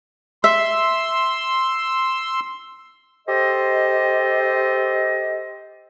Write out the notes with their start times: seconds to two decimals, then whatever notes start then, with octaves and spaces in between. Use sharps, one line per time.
0.44 E5 C6 E6
3.27 G4 A4 C5 D#5